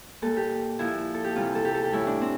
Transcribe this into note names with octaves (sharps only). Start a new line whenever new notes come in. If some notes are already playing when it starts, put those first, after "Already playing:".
A#2 G3 A4
G4
A#2 F3 E4
A4
G4
C3 E3 G3 F4
A4
G4
A4
G4
A2 E3 G3 E4
D4
C4